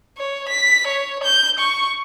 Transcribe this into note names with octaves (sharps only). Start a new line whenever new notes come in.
C#5
B6
C#5
G6
C#6